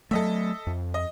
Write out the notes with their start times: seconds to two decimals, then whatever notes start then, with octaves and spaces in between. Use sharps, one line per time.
0.11 F#3 A3 A4 D#5 E5
0.67 F2
0.94 D#5